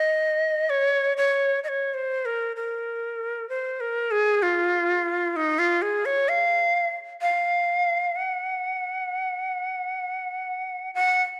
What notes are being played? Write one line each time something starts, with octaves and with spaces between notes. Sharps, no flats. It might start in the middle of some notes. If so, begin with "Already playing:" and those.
Already playing: D#5
C#5
C#5
D#5
C#5
C5
A#4
A#4
C5
A#4
G#4
F4
D#4
F4
G#4
C#5
F5
F5
F#5
F#5